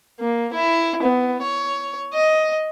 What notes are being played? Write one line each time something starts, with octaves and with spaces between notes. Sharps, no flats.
A#3
E4
B3
C#5
D#5